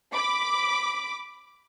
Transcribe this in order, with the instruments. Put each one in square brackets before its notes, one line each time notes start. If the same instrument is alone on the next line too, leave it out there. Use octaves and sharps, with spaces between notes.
[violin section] B5 D6